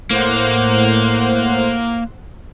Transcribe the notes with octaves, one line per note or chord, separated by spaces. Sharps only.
A2 A#3 C5 F#5